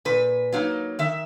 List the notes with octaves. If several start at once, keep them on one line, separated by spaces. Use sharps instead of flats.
A#2 B4
F#3 A#3 D#4
D#3 E5